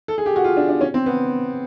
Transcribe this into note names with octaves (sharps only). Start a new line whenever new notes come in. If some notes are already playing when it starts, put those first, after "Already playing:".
A4
G#4
G4
F#4
F4
D4
D4
C#4
C4
B3